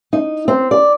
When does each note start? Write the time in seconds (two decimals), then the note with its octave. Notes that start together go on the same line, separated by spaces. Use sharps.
0.13 D#4
0.48 C4
0.71 D5